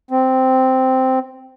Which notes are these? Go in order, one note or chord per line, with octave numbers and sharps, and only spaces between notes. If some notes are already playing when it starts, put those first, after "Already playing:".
C4